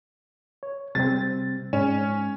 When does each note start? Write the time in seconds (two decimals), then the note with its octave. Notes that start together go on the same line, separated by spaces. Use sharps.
0.63 C#5
0.95 C3 G3 C4 A6
1.73 G#2 C#4